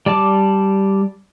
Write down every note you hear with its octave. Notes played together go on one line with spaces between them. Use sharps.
G3 D5 A5 D6